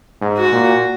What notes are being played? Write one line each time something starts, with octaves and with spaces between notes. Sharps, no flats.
G#2
F#4
A#2